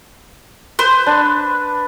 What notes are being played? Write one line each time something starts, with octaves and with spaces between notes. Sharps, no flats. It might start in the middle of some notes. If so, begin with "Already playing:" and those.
B4 C5
D4